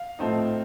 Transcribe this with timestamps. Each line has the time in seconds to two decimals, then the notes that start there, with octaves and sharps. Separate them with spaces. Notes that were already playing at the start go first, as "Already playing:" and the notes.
Already playing: F5
0.19 A2 F3 A3 C4 D#4